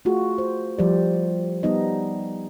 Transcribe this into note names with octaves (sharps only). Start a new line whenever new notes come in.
A3 F4 F#4 G#4
C5
F3 G3 G4 C5 D5
G3 B3 D#4 D#5